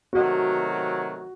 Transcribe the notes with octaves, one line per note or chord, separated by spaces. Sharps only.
C3 D#3 F#3 A3 F#4